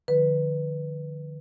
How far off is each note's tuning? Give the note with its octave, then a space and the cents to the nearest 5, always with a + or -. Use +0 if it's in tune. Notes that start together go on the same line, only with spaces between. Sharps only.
D3 +35 F3 +0 B4 +0